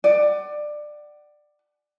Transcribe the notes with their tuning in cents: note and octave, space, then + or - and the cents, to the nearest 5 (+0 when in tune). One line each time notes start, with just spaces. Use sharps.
D5 +15 F#5 +35